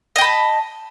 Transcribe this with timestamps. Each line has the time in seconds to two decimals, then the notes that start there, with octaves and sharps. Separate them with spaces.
0.16 D#5
0.18 G5
0.21 B5
0.24 A5